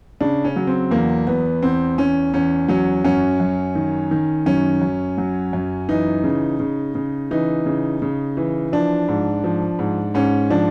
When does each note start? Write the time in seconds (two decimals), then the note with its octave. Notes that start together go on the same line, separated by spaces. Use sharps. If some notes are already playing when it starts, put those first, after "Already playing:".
0.21 C#3 D4
0.45 C#4
0.56 F#3
0.67 C4
0.91 E2 A#3
1.27 E2 B3
1.62 E2 C4
1.98 E2 C#4
2.34 E2 C#4
2.68 F#3 C#4
3.05 F#2 C#4
3.40 F#2
3.75 D#3
4.11 D#3
4.46 F#2 C#4
4.82 F#2
5.18 F#3
5.53 F#2
5.89 E3 D#4
6.24 C#3
6.60 C#3
6.95 C#3
7.31 E3 D#4
7.66 C#3
8.02 C#3
8.37 E3
8.72 F3 D4
9.08 G#2
9.44 F3
9.79 G#2
10.14 G#2 C#4
10.50 F3 D4